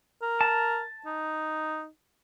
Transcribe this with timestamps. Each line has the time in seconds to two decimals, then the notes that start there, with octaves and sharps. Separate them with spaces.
0.22 A#4
0.41 A5
1.06 D#4